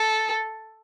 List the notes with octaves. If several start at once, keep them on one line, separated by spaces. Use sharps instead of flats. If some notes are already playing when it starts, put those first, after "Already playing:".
Already playing: A4